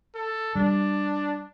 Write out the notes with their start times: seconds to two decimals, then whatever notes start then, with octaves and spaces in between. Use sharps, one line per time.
0.15 A4
0.55 G3 D4